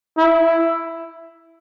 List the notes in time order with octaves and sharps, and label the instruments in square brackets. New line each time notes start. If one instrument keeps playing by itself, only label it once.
[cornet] E4